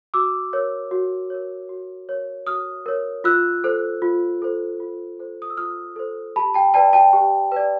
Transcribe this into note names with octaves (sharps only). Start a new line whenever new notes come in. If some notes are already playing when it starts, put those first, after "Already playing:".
F#4 D6 E6
A#4 C#5
F#4
A#4 C#5
F#4
A#4 C#5
F#4 D#6 F6
A#4 C#5
F4 E6 F#6
A4 C5
F4
A4 C5
F4
A4 C5
D#6
E6
F4 D#6 F6
A4 C5
G4 A5 B5
G5 A5
B4 D5 G5 A5
G5 A5
G4
B4 D5